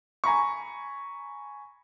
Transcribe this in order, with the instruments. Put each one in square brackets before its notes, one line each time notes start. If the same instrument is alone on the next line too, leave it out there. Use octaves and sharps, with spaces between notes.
[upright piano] G#5 A#5 B5 C#6